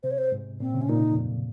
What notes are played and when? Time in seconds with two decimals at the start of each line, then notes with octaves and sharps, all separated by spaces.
0.03 C3 C5
0.11 C#5
0.18 C5
0.32 G#2
0.60 A#2 C4
0.74 C#3
0.81 C3 C#4
0.89 A#2 D#4
1.12 F2
1.22 F#2